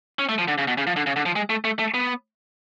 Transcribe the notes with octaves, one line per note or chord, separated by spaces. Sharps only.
C#4
A3
F3
D3
C#3
B2
C#3
F3
D3
C#3
D3
F3
G#3
A3
A3
A3
B3